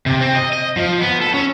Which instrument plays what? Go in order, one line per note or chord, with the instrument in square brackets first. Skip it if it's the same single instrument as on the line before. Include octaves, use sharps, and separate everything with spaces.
[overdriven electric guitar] C3
C4
D#5
D#5
F3
B3
A4
C#4